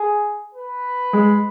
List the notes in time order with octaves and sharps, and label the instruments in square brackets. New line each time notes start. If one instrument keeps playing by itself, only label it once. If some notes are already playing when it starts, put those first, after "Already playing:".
Already playing: [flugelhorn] G#4
B4
[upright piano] G#3